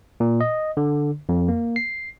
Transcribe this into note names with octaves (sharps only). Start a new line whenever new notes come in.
A#2
D#5
D3
F2
A#3
C7